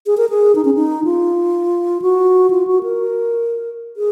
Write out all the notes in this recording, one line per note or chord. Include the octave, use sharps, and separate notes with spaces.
G#4
A#4
G#4
D#4
C#4
D#4
F4
F#4
F4
F#4
A#4
G#4